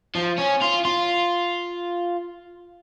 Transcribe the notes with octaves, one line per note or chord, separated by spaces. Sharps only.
F3
C#4
F4
F4